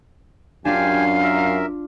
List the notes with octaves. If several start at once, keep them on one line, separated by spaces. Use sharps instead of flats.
F#2 D4 F4 G4 F5 G#5
A#4 E5